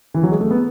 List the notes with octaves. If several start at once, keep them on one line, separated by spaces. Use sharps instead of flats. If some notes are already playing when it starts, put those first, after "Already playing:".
E3
F#3
G#3
A3
B3